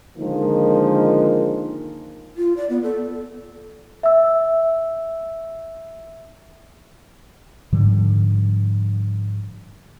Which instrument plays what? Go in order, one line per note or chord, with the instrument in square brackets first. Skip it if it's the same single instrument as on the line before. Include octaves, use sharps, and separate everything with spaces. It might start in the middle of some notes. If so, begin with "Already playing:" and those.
[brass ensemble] D3 D#3 F3 G#3 A#3 D#4
[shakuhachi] F4
D5
B3
A4
[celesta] E5 E6
[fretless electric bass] G#2 D3 F3 G3